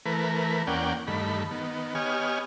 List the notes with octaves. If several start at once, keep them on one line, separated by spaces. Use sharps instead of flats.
E3 A3 A#4 B4
E2 A#3 C#4 D5 F#5 G5
G2 D#3 A3 B5
D#3 B3
B3 G4 C#5 D#5 G#5 F6